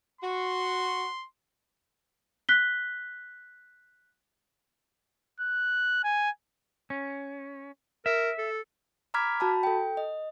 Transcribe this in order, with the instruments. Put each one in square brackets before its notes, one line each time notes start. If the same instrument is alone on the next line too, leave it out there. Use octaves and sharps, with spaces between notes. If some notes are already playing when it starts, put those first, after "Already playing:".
[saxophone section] F#4 [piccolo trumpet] C6
[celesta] F#6 B6 G7
[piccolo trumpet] F#6
G#5
[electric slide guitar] C#4
[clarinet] A#4 [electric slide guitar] E5
[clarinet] A4
[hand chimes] A#5 B5 D6 F6 G#6 B6
F#4 A5 B5
A4 G5
D#5